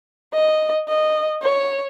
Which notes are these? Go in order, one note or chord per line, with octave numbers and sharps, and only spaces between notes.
D#5
D#5
C#5